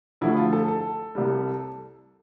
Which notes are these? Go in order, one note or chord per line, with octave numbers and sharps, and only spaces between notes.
D2 D3 F3 A3 E4
F4
A4
A4
C2 C3 G3